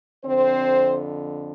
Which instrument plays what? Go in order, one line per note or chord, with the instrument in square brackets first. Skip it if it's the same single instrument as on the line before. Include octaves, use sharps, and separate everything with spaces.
[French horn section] F2 D3 C4 C5